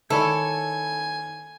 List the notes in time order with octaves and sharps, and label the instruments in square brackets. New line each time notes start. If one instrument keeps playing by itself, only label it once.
[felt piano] D#3 [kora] E4 C#5 D5 [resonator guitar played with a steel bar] A4 [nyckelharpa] G#5